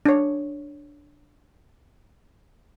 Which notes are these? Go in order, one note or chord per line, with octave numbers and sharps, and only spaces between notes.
D4 C#5